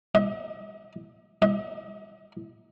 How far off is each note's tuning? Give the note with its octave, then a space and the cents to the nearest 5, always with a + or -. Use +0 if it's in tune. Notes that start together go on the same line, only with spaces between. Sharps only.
D#5 +45
D#5 +45